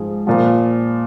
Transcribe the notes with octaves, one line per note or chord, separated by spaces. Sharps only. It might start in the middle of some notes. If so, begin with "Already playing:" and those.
Already playing: G#2 F3 G#4
A#2 F3